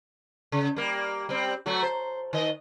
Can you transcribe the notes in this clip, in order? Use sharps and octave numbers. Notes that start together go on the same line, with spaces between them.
C#3
G3 A#3
G3 C4
F#3 A3 F#4
C5
D#3 D#5